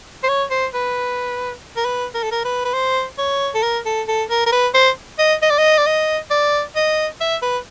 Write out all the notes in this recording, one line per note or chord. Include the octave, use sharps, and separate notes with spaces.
C5
C#5
C5
B4
A#4
B4
A#4
A4
A#4
B4
B4
C5
C#5
A4
A#4
A4
A4
A#4
A#4
B4
C5
D#5
D#5
D5
D#5
D5
D#5
D5
D#5
E5
B4